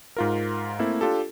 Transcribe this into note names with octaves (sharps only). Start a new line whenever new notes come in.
G#2 F4 A#4
A3 A#3 C4 E4 A4
D4 F4 G4 A4